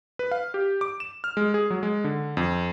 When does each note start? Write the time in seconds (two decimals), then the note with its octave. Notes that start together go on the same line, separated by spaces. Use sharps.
0.19 B4
0.31 F5
0.54 G4
0.81 D6
1.00 E7
1.24 F6
1.37 G#3
1.54 G#4
1.71 F#3
1.83 G#3
2.04 D3
2.37 F2